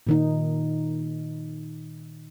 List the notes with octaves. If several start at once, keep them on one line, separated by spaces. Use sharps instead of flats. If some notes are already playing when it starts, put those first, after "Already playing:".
A#2 D#3 D#4